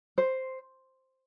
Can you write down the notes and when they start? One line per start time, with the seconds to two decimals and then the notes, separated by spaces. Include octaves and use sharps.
0.18 C5